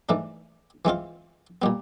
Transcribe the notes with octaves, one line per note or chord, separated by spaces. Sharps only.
G#2 E3 A3 D4
E3 G#3 C4 F4
A#2 G3 B3